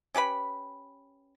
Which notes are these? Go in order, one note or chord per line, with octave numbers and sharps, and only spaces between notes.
C#4 G4 B4 B5